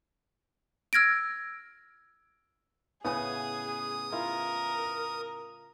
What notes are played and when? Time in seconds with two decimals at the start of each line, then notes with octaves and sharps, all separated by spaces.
0.93 E6 F6 G#6 A#6 D7
3.05 A2 C#3 B3 G#4 F#5 G#5 D#6
4.12 E4 F4 A#4